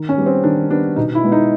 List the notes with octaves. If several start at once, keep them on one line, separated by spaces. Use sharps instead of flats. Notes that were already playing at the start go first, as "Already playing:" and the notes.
Already playing: D#3
C#4
G3 B3
C4
D#3 D4
G3 B3 D4
B2 D#4
E4
G#3 B3
D#4